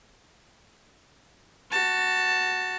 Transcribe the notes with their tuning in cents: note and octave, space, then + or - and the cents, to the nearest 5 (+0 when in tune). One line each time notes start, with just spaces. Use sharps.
F#4 +0 A5 +15